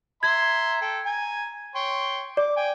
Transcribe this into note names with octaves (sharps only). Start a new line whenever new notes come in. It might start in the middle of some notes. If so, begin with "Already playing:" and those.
E5 A#5 C6 G#6
A4 G5
G#5 A#5
C#5 G5 C6
D5 D6
G5 G#5